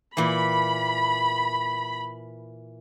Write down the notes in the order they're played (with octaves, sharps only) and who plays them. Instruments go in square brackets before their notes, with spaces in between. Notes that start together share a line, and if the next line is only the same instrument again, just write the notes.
[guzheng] A#2 E3 [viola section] B5